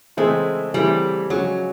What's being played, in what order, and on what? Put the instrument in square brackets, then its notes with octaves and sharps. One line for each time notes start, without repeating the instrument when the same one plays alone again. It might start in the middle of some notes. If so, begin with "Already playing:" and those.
[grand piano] C#3 E3 A3 C4 E4 [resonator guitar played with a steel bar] G#3
[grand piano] C#3 E3 A3 C4 E4 [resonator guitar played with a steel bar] G3
[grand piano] C#3 F3 G#3 C#4 [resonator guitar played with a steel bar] F#3